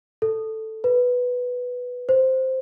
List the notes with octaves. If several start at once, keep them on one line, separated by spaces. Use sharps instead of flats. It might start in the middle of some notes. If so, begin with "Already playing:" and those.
A4
B4
C5